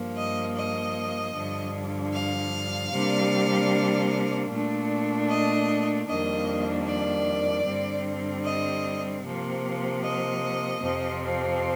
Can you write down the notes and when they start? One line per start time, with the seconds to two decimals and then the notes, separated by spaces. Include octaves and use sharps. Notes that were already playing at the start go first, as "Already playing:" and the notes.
Already playing: G2 F3 A#3
0.16 D#5
0.55 D#5
1.35 G2 D3 F3
2.13 F5
2.92 C3 G3 A#3 D4
4.50 A#2 A3 D4
5.29 D#5
6.07 F2 D#3 G3 A#3 D4 D#5
6.87 D5
7.66 G2 D3 G3 C4
8.45 D#5
9.24 C3 F3 A#3
10.03 D#5
10.81 F2 C3 F3 C4